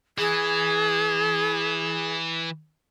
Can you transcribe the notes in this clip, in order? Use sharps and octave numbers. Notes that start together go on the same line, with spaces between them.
E3 G#4